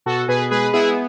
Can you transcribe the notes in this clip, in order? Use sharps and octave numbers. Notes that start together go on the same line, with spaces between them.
B2 F#4 A4
B2 G#4 B4
G#3 G#4 B4
B3 E4 G#4